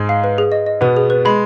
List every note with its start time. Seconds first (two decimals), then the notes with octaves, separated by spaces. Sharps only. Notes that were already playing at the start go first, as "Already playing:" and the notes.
Already playing: G#2 G#3
0.09 F5
0.24 B4
0.38 G#4
0.52 D#5
0.66 D#5
0.81 B2 B3 B4
0.97 G#4
1.10 B4
1.25 G#3 B5